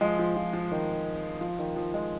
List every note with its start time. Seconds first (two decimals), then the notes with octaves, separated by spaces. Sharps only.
0.01 F3 G#3
0.19 F3
0.36 F3
0.53 F3
0.72 D#3
1.41 F3
1.59 D#3
1.76 F3
1.93 F3 G#3